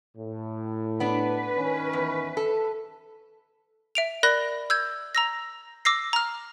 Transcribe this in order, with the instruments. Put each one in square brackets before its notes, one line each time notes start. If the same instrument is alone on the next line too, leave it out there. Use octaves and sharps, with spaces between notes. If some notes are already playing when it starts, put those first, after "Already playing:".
[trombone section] A2
[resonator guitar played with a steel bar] B3 D4 [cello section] B4
[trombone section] D#3 C#4
[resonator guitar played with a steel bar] E2
A4
[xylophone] E5 D7 F7
A#4 D5 B5 F#6 A#6
E6 G6 G#6
A#5 E6 A#6
D6 E6 A#6 C7
A#5 F6